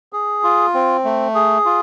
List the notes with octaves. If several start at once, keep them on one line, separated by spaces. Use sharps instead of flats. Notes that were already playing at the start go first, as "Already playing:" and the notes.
G#4
F4
C4
A3
G#4
F4